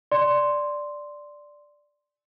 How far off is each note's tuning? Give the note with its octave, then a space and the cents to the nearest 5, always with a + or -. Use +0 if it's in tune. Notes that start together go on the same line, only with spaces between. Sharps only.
D5 +0 C6 -5